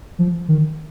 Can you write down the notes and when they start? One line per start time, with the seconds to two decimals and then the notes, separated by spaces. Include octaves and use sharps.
0.19 F3
0.48 D#3